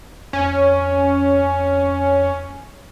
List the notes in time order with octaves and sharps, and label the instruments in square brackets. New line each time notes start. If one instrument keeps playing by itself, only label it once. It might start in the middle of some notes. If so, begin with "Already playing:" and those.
[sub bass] F2 [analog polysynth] C#4